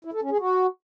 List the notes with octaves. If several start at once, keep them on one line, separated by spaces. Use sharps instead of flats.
E4
A4
C#4
G#4
F#4